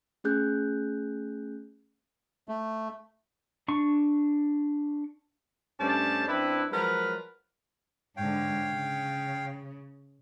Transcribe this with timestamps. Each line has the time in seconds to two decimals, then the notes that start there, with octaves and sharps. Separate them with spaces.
0.24 A3 C#4 G#4 F#6 G6
2.49 A3
3.68 D4 C#6
5.79 G2 A3 C#4 C5 D5 A5
6.27 F#2 C4 D4 E4 B4
6.71 F3 F#3 G#3 A#4 B4
8.17 G#2 D3 C#5 F5 G5
8.72 C#3